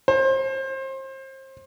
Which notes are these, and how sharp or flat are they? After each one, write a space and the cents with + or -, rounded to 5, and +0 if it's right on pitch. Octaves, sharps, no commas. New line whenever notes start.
C5 +30